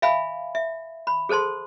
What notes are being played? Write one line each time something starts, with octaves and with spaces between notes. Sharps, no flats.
E5 F5 G#5 B5
E5
B5
G#4 A4 C5 A5 C6